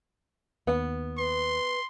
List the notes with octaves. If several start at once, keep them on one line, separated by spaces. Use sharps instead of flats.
D#2 B3 F#5
B4 C6